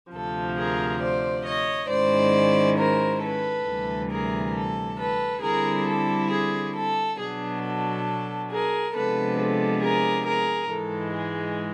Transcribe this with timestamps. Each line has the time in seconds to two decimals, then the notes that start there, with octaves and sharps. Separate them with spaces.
0.12 D2 C3 F3 A4
0.57 G#4 A#4
1.01 C5 D5
1.45 C#5 D#5
1.89 G#2 D#3 G#3 C#4 E4 C5 D5
2.77 A#4 C5
3.21 A4 B4
3.66 D2 C3 E3 G3
4.10 G#4 A#4
4.54 A4
4.98 A4 B4
5.41 D3 G3 C4 E4 G#4 A#4
5.86 A4
6.31 G#4
6.74 A4
7.19 B2 F#3 B3 D4 G#4
7.62 A4
8.50 G#4 A#4
8.94 C3 F3 G#3 B3 D4 A4 B4
9.39 A4
9.83 G#4 A#4
10.27 G#4 A#4
10.71 G#2 E3 G#3 A4
11.15 G#4